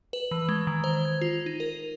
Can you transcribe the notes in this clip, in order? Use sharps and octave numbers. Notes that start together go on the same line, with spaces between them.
B4
E3
G#3
D#3
C5
G#6
F4
D#4
A#4